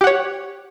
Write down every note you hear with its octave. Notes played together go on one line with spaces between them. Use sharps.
G4 C#5 F#5